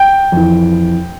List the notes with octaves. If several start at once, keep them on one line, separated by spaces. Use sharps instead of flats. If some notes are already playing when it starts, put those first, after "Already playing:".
Already playing: G5
F2 E3